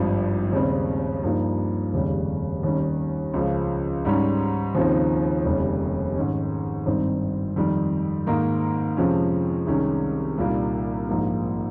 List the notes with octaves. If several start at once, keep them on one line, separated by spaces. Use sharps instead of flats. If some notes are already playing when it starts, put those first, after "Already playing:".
Already playing: G#1 G2 F3
D#2 C#3 G3 C4
G2 F3 A#3 D#4
F1 D#2 C#3 G3
D#2 D#3 G3 C#4
C#2 C#3 F3
G#2 G3 C#4
D#2 C#3 F3 C4 D#4
F1 D#2 C#3 G3
G#2 D#3 G#3 C#4
G#1 G2 D#3 G3 C4
F2 D#3 G3
G#2 D#3 A#3 D#4
F2 C3 F3 G#3 C#4
C2 C3 D#3 G#3 C#4
C2 A#2 G3 A#3 D#4
A#1 G#2 F3 A#3 D#4